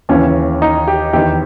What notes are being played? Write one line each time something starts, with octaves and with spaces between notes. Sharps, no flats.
D#2 C#3 E3 C#4
D#4
G4
E2 D#3 G4